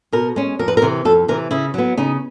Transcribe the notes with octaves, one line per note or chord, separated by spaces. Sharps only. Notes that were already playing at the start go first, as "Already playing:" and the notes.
B2 A#4
G#3 C#4
F2 A#4
B4
A#4
C3 E3
F2 A4
C3 E3 A#4
C#3 E4
F#3 B3
C#3 D#4